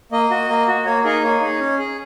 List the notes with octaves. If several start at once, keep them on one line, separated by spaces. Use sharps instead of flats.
A#3 D#5
F#4
A#3
F#4
A#3 C#5
D#4 G#4 A#4
A#3 C#5
D#4 G#4
C#4
G#4